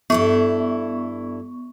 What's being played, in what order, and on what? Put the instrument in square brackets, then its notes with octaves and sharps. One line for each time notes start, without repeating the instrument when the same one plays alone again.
[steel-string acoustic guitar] G2 E4 A4 [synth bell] B3 C#6